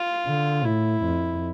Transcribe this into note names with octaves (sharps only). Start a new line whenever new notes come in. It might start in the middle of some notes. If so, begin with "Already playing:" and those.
Already playing: F4
D3
A2 E4
F2